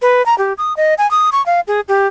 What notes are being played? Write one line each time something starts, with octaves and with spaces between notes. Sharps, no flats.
B4
A#5
G4
D#6
D#5
G#5
D#6
C#6
F5
G#4
G4